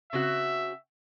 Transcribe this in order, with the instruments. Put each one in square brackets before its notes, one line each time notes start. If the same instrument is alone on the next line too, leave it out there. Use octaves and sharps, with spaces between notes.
[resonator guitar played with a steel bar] C#3 C4 F#4 [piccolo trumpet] E5